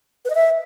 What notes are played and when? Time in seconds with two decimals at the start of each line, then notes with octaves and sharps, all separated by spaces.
0.25 B4
0.30 D#5
0.35 E5